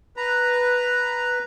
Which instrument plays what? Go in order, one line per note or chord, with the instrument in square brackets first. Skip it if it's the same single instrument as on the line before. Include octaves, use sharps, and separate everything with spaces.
[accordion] B4 A#5